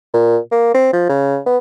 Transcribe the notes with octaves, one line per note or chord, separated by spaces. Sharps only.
A#2
A#3
C4
F3
C#3
B3